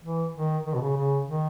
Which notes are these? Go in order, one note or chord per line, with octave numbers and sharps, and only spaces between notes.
E3
D#3
D#3
B2
C#3
C#3
D#3